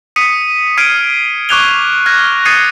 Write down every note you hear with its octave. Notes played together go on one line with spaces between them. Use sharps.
D#6 B6 C#7 D#7
D#6 F6 G#6 C7 D7 D#7
C#6 D6 F#6 G#6 F7 G7
F6 F#6 G#6 A#6
D#6 G#6 A6 C7 C#7 D#7